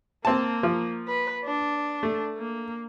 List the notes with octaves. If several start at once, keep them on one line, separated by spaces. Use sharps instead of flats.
A#3 C4 A5
F3
B4
D4
A3
A#3